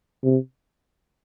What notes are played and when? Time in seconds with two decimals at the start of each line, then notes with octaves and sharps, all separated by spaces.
0.23 C3